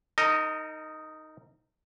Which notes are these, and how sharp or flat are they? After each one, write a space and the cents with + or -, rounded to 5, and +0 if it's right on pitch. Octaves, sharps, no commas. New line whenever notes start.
D#4 +0 A#4 -40 D#5 +0